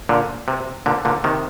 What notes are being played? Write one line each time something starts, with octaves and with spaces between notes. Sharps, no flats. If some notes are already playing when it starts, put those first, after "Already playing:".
A#2 D3
C3
A#2 D3
A#2 D3
C3 D#3